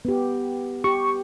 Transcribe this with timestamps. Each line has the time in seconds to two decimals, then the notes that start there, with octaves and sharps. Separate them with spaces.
0.05 B3 G4
0.84 G4 C#6